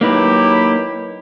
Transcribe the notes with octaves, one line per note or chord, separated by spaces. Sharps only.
F#3 A#3 D#4 E4 G4 B4